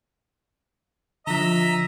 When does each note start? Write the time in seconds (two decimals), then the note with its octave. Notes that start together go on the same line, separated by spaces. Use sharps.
1.27 D3 F3 D#5 E5 A#5